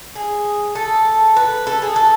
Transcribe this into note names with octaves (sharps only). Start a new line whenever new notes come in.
G#4
A4
B4
A4
G#4
A4